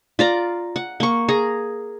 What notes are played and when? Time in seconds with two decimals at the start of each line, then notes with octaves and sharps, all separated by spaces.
0.19 F4 D5 A#5
0.76 F#5
1.00 A#3 C#6
1.28 G#4 A#5